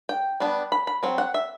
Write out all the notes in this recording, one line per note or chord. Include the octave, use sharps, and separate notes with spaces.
G5
G3 B3 D4
B5
B5
F#3 C4
F#5
E5